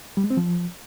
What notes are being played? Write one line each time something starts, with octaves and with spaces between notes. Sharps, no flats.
G3
G#3
C4
F3